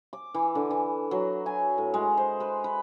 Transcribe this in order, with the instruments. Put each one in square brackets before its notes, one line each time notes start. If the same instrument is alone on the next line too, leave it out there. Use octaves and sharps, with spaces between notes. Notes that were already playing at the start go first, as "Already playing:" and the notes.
[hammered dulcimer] D6
E3
D3
E3
F#3
G#5
A2
G#3
C5
B4
B4